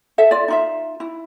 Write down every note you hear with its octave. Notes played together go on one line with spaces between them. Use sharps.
A4 E5
F4 D5
D#4 F4 E5
E4